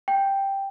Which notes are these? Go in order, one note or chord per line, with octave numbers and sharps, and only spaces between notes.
G5